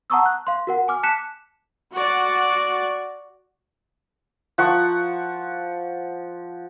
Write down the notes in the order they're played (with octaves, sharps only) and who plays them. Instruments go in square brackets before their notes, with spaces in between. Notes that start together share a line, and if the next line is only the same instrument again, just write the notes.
[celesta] F#5 A5 A#5 C#6 D#6 E6
F#6
F5 C6
F#4 A#4 F#5
G#5 D6 F6
A5 D6 F#6 B6 C#7 E7
[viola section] F#4 D5
[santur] F3 F#5 C#6